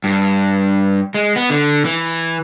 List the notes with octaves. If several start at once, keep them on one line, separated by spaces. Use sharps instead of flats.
G2
G#3
B3
D3
E3